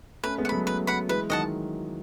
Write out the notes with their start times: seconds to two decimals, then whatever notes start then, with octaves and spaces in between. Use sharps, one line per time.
0.24 A3 C#4 B4
0.38 G#3 B3
0.45 F#5
0.49 F#3 A3 B5
0.67 B4
0.87 F#5 B5
1.09 E3 G#3 B4
1.30 D#3 F#3 D#5 F#5 A5